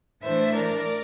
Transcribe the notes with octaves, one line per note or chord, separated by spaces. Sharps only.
A2 E3 A3 D4 C5 E5
A#4 D5